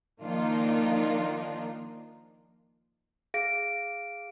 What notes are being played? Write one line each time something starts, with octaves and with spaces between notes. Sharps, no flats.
D#3 F3 A#3 D4 D#4 F4
G#4 F5 A#6 D7